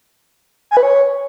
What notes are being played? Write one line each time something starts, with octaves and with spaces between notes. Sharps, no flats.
G#5
B4
C#5